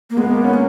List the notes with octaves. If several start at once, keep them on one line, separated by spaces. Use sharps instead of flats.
A#3
G#3 B3
A#3
C#4
A#3